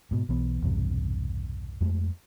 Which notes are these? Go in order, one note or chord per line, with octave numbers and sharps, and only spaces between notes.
G#2 B2
B1 E3 B3
B1 E2 G2 C3
F2 G#3 A3